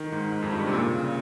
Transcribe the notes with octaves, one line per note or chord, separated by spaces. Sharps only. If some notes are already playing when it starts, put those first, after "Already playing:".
Already playing: D#3
G#2
G#2
F2
G2
C3
A#2
C#3